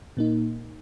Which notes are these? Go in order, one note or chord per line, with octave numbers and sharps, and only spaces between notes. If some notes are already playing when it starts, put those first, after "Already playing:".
A#2 A#3 D#4